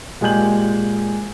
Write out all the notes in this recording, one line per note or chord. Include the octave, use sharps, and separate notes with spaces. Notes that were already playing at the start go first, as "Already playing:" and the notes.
A#2 G#3 G4 G#5 G6 F#7